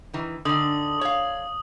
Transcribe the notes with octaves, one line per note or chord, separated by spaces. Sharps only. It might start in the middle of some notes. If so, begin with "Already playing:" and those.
D#3 E3
D3 D#3 D#6 F#7
C#5 F5